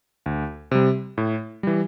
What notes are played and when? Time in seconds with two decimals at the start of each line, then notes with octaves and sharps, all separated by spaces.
0.26 D2
0.71 C3 G3
1.18 A2
1.63 E3 G3